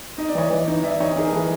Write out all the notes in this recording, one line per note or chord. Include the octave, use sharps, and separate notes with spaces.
D#4 D#5
D5
E3 C#5 D#5
E3
D#4
E3 D5 E5
D#4 C#5 D#5
D#4 G#4 A#4
E3 A4 B4